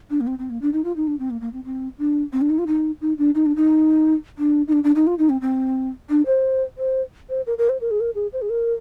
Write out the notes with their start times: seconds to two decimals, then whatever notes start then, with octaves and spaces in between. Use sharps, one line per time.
0.10 D4
0.21 A#3
0.27 C4
0.39 C4
0.50 A#3
0.62 D4
0.73 D#4
0.84 F4
0.96 D#4
1.07 D4
1.19 C4
1.30 A#3
1.41 A#3
1.53 C4
1.65 C4
1.98 D4
2.33 C4
2.41 D4
2.50 D#4
2.58 F4
2.67 D#4
3.01 D#4
3.18 D4
3.35 D#4
3.46 D4
3.56 D#4
4.38 D4
4.68 D#4
4.72 D4
4.84 D4
4.95 D#4
5.07 F4
5.19 D#4
5.29 C4
5.41 C4
6.10 D4
6.26 C5
6.78 C5
7.29 C5
7.47 A#4
7.58 A#4
7.69 C5
7.81 A#4
7.91 G#4
8.00 A#4
8.15 G#4
8.33 C5
8.42 G#4
8.50 A#4